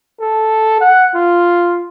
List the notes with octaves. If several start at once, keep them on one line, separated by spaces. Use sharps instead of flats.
A4
F#5
F4